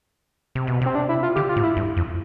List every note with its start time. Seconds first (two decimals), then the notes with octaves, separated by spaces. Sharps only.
0.55 C3
0.67 B2
0.82 C3 C4
0.95 D4
1.09 E4
1.23 F4
1.36 D3 G4
1.49 F4
1.57 A2
1.63 E4
1.77 G2
1.97 F2